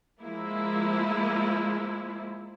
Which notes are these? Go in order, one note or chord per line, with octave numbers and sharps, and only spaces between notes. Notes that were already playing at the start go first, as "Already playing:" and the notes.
F3 G#3 A#3 E4